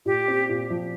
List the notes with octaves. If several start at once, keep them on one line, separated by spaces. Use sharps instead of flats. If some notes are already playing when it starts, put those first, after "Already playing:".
A#2 G4
C4
A#2
F3